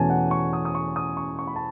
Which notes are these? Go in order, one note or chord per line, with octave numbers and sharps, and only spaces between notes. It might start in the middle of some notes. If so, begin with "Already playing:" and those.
Already playing: E2 B2 A3 C#4 G#5 A5
F#5
C#6
D#6
D#6
C#6
D#6
C#6
C#6
B5
A5